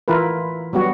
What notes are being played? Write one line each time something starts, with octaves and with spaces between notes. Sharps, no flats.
E3 E4 F4 A#4 B4
F#3 G3 B3 F#4